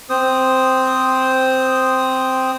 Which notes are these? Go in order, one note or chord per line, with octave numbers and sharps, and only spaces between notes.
C4 C5 D#6